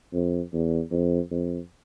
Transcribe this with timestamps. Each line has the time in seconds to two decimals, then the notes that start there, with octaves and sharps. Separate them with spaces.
0.13 F2
0.53 E2
0.91 F2
1.31 F2